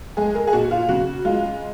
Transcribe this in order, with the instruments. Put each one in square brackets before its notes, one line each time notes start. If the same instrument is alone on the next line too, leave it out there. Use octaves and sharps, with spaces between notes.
[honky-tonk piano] G#3 G#4
A#4
G#4
A#2 F#4
F4
C#3 F#4
G#3 F4